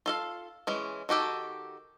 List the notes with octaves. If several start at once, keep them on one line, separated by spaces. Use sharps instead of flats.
F4 A4 F5
E3 G#3 C#4
D#3 F#4 G4 A4